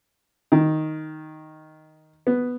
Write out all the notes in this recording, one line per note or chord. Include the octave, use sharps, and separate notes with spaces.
D#3
B3